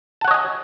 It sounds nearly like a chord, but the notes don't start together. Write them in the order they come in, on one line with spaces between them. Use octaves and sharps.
A5 F#5 C#5 D#5 G#5